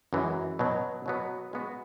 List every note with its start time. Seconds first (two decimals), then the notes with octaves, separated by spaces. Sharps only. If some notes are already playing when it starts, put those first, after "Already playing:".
0.13 F#2 E3 G#3
0.59 B2 F#3 B3
1.06 B2 F#3 B3
1.53 G#3 B3 F#4